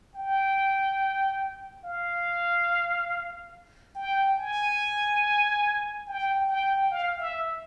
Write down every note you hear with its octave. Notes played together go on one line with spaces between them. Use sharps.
G5
F5
G5
G#5
G5
G5
F5
E5